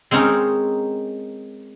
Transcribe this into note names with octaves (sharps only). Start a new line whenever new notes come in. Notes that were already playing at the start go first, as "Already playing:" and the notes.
G#3 C4 C#4 D#4 A#4